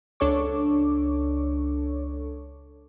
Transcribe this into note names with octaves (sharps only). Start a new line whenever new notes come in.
C#2 D4 A4 C#5 C#6 D6